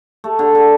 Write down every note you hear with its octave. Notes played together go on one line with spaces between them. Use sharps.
A3
D3
D3